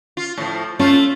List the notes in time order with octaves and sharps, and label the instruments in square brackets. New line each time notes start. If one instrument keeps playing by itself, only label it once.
[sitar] F4
A2 F3
[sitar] A3 F4 [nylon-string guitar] C#4